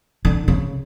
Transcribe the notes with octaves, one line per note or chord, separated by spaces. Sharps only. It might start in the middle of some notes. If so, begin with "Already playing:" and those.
D3
C#3